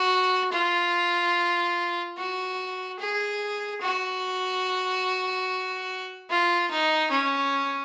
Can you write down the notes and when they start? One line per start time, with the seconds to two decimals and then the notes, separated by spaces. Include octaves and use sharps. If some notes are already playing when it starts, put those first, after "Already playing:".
Already playing: F#4
0.52 F4
2.17 F#4
2.99 G#4
3.81 F#4
6.30 F4
6.71 D#4
7.12 C#4